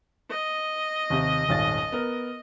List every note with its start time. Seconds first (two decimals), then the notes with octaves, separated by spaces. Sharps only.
0.31 D#5
1.10 D#2 C3
1.49 D#1 G#1 A6
1.92 B3 A#4